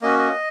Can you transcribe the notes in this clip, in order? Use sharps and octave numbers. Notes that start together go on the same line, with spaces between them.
A#3 C#4 F#4 D#5
D#5